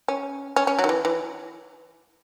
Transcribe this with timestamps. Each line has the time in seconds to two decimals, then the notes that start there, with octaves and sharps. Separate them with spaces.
0.08 C#4
0.56 C#4
0.67 C#4
0.79 F#3
0.84 D#3
0.89 E3
1.05 E3